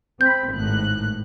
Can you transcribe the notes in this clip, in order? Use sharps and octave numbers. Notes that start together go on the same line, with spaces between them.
C4 B5 G6
G#1 A2 F#6